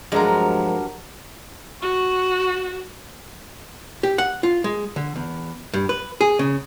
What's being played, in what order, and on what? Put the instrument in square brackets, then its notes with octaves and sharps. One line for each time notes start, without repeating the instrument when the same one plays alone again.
[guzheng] G2 F#3 A#4 [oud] F3 G#3
[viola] F#4 [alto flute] C#6
[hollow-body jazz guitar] G4
F#5
F4
G#3
D3
E2
G2
B4
G#4
C#3